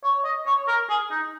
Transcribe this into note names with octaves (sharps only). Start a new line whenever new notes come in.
C#5
D#5
C#5
A#4
G#4
D#4